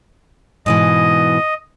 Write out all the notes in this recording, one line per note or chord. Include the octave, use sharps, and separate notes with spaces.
G#2 B2 E3 D#5